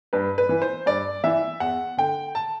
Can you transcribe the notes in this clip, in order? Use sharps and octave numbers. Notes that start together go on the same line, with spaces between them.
G2 B4
B4
E3
C5
G2 D5
E3 E5
E2 F#5
D3 G5
A5